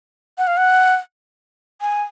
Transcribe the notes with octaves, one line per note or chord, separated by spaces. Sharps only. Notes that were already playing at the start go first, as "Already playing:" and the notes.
F#5
F5
F#5
G#5